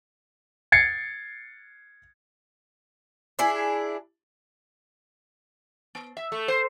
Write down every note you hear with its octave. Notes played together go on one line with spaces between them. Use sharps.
G#6 A6 C7 C#7
D4 E4 G#4
B3
E5
A3
C5